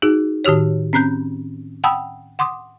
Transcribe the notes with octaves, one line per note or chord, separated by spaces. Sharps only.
D#4 F#4 G#4
A2 D#3 F#4 G4 C#5
C4 C#4 A#5 F#6 G6
F#5 G5 A5 B5 D#6 E6
F#5 C6 D6 D#6